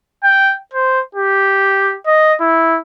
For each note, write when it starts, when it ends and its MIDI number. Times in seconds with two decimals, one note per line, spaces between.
0.24 0.56 79
0.73 1.00 72
1.15 1.96 67
2.07 2.34 75
2.41 2.79 64